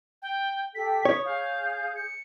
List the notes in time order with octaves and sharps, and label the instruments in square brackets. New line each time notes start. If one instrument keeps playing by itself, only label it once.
[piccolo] G5
[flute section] G4 A4 G5 [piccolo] B6
[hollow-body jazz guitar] C#5 [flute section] D#6
[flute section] G#4 G6 [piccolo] F5
[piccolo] C#7